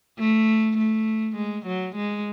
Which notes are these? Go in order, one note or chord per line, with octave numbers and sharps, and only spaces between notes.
A3
A3
G#3
F#3
G#3